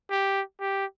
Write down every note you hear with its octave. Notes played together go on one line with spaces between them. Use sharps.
G4
G4